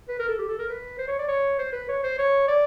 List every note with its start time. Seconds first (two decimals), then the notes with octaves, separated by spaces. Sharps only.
0.09 B4
0.19 A#4
0.28 A4
0.39 G4
0.48 A4
0.58 A#4
0.69 B4
0.99 C5
1.08 C#5
1.19 D5
1.28 C#5
1.59 C5
1.73 B4
1.89 C#5
2.04 C5
2.19 C#5
2.48 D5